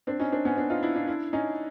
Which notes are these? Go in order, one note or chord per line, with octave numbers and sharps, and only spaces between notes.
C4 D4
C#4 D#4
C4 D4
B3 C#4
C4 D4
D#4 F4
D4 E4
D4 E4
D4 E4
C#4 D#4